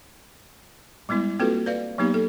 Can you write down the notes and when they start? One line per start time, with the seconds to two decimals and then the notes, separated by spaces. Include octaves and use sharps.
1.09 G3 G#3 B3 E4
1.39 A#3 C4 F4 F#4 A4 B4
1.66 B4 D5 F5
1.98 F#3 A#3 B3 D#4 G4
2.14 A4